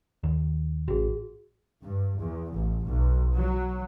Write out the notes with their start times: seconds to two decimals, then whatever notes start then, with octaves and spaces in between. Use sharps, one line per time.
0.23 D#2
0.88 A1 F#4 G#4
1.83 G2
2.19 E2
2.53 A1
2.86 B1
3.36 F#3